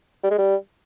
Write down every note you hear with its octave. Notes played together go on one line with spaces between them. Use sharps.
G3
G#3
G3